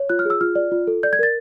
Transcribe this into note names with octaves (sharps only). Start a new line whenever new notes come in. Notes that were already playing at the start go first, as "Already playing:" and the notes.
Already playing: C#5
F4 F#6
F6
G#4 E6
F4 F6
D5
F4
A4
D5 G6
G#6
A#4 A6